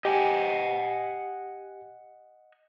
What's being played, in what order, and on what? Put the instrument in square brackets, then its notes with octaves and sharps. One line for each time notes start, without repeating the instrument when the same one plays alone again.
[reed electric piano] G4 [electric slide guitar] D#5 F#5 G#5